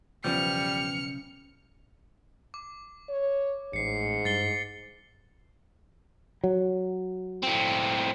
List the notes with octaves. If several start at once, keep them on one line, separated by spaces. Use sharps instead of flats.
B1 E2 C#3 F3 G3 B3 F6 C#7
D6
C#5
A1 G#2 C7 C#7
G2 A6 C7 G7
F#3
A2 C4